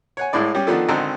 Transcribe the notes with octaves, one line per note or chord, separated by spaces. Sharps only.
C#5 F#5 G#5
C2 A2 G#3 E4 D5
G3 C#4 G4
D#3 F3 B3 D4 F4 A4
G#1 D3 D#3 C4 A#5 E6